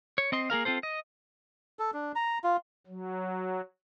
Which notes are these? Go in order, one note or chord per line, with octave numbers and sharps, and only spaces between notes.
C#5
C4 D#5 C6
A#3 G#4 A#4 F5
C4 F4 A4 C5
D#5
A4
D4
A#5
F4
F#3